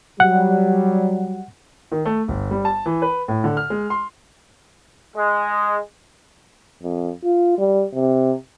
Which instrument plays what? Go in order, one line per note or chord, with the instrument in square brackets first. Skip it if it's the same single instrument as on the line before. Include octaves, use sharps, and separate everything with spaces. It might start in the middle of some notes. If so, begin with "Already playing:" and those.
[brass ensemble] F#3 G3 [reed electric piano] F#5
[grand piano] D#3
A3
G1
G3
A5
E3
B4
A2
D3
F6
G#3
C6
[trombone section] G#3
[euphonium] F2
F4
G3
C3